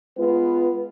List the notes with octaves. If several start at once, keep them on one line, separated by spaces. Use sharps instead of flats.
G#3 B3 F4 B4